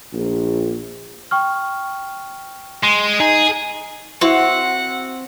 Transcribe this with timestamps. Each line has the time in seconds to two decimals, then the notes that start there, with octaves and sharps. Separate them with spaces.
0.13 A#1
1.31 G5 C#6 F6
2.83 G#3 C6
3.20 D#4 G#4
4.21 C4 E4 F#4 F#5